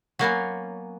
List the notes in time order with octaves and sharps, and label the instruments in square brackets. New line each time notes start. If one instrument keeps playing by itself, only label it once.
[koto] F#3 A#3 B3 C#4